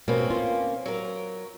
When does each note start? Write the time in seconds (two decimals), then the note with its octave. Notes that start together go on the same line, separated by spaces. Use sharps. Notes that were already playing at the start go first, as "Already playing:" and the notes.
0.08 B2 A#3 C4 C#4
0.30 F4
0.86 F#3 A#4